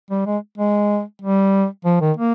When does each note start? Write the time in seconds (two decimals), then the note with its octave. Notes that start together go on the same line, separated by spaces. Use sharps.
0.10 G3
0.26 G#3
0.58 G#3
1.22 G3
1.85 F3
2.01 D#3
2.17 A#3